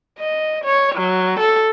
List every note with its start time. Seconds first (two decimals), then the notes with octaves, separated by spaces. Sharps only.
0.19 D#5
0.65 C#5
0.96 F#3
1.40 A4